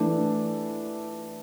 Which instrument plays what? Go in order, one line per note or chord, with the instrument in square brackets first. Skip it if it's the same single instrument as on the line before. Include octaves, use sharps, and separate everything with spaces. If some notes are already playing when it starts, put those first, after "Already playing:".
Already playing: [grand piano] E3 A3 D4